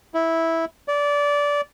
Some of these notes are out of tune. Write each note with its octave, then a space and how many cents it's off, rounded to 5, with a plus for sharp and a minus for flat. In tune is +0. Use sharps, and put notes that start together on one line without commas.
E4 -10
D5 -20